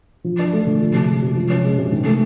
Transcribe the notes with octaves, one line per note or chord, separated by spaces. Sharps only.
F3
D4
A3
D3
F3
C3
G#3
C3
F3
C#4
G#3
C3
D#3
A3